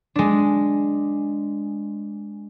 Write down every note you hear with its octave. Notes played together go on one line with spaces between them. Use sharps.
G#3 D4